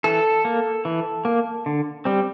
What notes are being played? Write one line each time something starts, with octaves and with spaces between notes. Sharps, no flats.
E3 A4
A#3
E3
A#3
D3
G3 C4